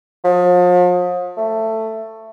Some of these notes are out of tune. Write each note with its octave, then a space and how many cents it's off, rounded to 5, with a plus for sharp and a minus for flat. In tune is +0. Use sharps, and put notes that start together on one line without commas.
F3 +40
A3 +10